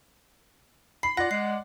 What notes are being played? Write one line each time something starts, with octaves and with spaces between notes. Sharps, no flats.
B5 C7
F4 D5 F#5 A#6
G#3 C7